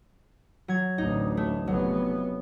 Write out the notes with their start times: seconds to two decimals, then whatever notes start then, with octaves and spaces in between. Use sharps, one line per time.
0.68 F#3 G#6
0.98 A1 D2 D#4
1.37 A3
1.67 F1 F#3 B3